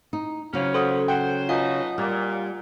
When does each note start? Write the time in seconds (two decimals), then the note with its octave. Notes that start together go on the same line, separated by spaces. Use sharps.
0.13 D#4
0.53 C#3 F3 F#3 A#3 C#4
0.74 A4 C5 F#5 D#6
1.08 C5 F#5 G5
1.49 B2 D#4 F4 F5 F#5 G#5
1.98 A#2 G3